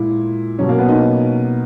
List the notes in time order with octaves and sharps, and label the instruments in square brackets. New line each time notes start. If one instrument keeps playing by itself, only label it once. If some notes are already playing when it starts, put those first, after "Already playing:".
Already playing: [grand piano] A#2 G#3 E4
B2 F#3 C#4
A#3
B3
D#4